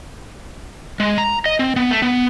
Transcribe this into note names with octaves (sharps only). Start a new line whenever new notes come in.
G#3
A#5
D#5
C4
B3
A3
B3